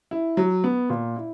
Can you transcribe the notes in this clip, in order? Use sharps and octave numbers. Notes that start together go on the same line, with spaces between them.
E4
F#3
B3
A#2
E4